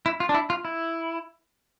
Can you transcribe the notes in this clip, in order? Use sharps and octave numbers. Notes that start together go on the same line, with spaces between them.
E4
F4
D4
E4
F4
E4